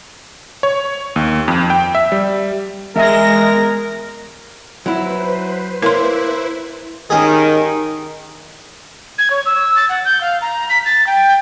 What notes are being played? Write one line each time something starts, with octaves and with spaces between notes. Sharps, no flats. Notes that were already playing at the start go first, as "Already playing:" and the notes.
C#5
D#2
F2
G5
E5
G3
E2 G#3 A#4 E5 G#5 A#6
F#3 E4 B4 C5
A#3 E4 A#4 C#5 C6
D#3 C#4 G4 G#4
G#6
C#5
E6
A6
F#5
G6
F5
A#5
B6
A6
G5